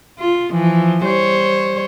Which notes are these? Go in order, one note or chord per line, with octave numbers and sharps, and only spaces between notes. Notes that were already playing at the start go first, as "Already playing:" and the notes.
F4
E3 F3
G3 C5 C#5